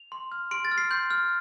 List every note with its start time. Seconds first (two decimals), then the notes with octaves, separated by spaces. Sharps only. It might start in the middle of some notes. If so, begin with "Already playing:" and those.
Already playing: F7
0.12 C6
0.32 F6
0.51 C6 D7
0.65 A6
0.71 F6
0.78 C7
0.91 C6 G6
1.10 F6